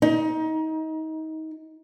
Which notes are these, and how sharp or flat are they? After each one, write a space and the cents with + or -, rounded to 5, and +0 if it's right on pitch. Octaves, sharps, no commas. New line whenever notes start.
D#4 +25